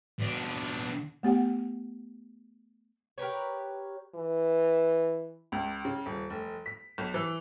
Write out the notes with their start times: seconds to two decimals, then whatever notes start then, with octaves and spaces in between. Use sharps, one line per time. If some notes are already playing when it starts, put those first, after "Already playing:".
0.20 B2 D4
1.23 A3 B3 G4 F#5
3.18 G4 A#4 B4 C#5
4.15 E3
5.52 C#2
5.85 C#3
6.06 D#1
6.30 F1
6.66 B6
6.98 B1
7.14 E3